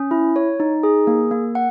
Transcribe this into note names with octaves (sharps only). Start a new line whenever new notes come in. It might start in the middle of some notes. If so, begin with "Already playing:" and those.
Already playing: C#4
E4
C#5
D#4
G#4
A#3
A#3
F#5